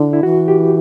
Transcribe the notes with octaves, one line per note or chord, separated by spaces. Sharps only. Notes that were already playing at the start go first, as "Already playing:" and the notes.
Already playing: D3 E4
E4
E3 F#4
G4